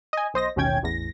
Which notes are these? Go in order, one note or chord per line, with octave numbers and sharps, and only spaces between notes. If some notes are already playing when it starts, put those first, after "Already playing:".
D#5 G#5
B1 C5 D#5 A#6
A1 D#2 B2 C#4 G5 G#6
A1 E2 A#6